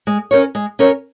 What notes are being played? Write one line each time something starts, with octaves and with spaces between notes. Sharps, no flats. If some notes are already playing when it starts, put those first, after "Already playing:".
G#3
C#4 A#4 C#5
G#3
C#4 A#4 C#5